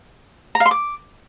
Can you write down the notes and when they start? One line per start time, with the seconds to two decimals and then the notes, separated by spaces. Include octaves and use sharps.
0.55 A#5
0.60 F5
0.66 C6
0.71 D6